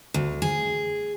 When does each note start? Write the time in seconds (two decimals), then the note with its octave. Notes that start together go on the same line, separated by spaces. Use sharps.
0.14 D2
0.42 G#4